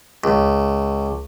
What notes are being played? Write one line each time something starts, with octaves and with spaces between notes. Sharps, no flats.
C#2